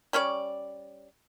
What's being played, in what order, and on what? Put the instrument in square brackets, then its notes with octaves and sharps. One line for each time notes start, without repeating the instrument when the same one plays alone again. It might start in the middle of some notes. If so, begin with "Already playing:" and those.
[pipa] G3 C#4 C#5 D5